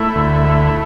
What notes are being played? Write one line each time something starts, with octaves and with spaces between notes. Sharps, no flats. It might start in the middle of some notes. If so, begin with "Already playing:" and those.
Already playing: A3 E4
D2
A3